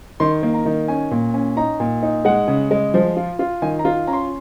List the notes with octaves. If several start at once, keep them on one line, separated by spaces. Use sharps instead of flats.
D#3 C6
A#3
A#5
D#3
C#4 G#5
A#2
C#4
D#4 A#5
A#2
D#4
G#3 F#5
C#3
G#3
F3
F4
F4
D#3 G#5
A#5
F4
C#4 A#5
C6